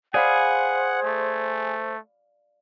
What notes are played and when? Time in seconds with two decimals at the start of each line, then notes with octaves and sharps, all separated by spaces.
0.14 G#4 C5 D5 F5 F#5 B5
1.03 A3